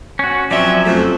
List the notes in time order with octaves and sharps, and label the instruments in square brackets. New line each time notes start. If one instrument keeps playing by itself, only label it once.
[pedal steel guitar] C#4 F#4
[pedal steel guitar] F3 F#3 C#4 [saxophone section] C4 D5 E5
[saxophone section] F2 C3 A3